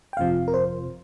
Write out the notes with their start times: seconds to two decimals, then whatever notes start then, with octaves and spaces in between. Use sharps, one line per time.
0.13 G5
0.17 G1 F2 C3 F3 C4 F5
0.48 A#4
0.54 C5